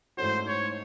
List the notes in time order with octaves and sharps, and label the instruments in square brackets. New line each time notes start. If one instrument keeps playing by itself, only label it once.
[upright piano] G#2 E3 A3 C#4 F#4 [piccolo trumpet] C5
[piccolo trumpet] C#5